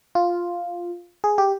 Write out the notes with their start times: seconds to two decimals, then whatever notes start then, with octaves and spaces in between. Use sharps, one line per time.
0.15 F4
1.24 G#4
1.38 G4